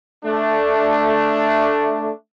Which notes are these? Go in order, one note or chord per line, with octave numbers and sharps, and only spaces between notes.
A3 D4